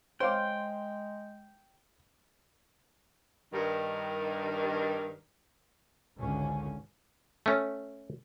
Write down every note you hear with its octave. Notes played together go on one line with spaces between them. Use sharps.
G#3 C5 C#5 F5 G5 D6
G2 D#3
G#1 C#2 D3 C#4
A3 C#4